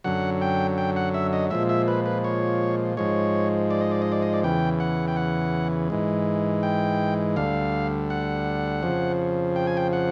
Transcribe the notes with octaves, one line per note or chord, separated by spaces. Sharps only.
F#2 D3 F#3 F#5
G5
G5
F#5
E5
D#5
A#2 F3 G#3 E5
E5
B4
B4
C#5
G#2 F3 G#3 C#5
D5
D#5
D5
D#5
D5
D#5
D5
E2 C#3 E3 G5
F#5
G5
F#5
G#2 E3 G#3
G5
D2 D3 G3 F5
F#5
F2 C#3 F3
G5
G#5
G5
F#5